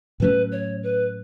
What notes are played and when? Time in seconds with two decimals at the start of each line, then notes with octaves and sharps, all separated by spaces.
0.20 A2 F#3 A3 C#4 B4
0.52 C#5
0.83 B4